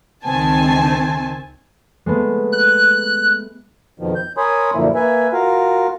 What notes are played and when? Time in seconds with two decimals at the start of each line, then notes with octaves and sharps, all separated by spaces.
0.25 C#2 D#3 C4 G#5 A5
2.06 G#3 A3 B3
2.53 F#6
4.00 F2 B2 D#3 F3
4.15 G6
4.37 A#4 C#5 G#5 B5 C6 D#6
4.74 F#2 A#2 D3 F3 A#3 E4
4.95 A#3 B4 E5 G#5
5.32 F4 F#4 A#4 F5